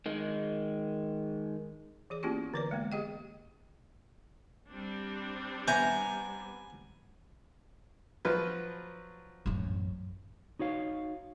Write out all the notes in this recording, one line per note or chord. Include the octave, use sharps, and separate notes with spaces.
D#3 G#3
E3 G#4 D5
A#3 B3 C#4 E4 F4 G4
D3 E3 B4 C#5 D5
G#3 A#3 B3
G4 G#4 D#5 G5
G3 C4 D4
B3 E5 G#5 A#5 G6
F3 F#3 B4
A1 F#2
D#4 F#4 C#5 F5